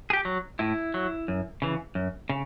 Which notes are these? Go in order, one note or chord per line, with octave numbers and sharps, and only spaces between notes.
G#4
G4
F#3
A2 E4
F#3
F#2
C#3 E3
F#2
C#3